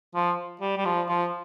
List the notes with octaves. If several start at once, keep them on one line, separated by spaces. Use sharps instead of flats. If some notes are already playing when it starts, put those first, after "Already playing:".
F3
G3
G3
F3
F3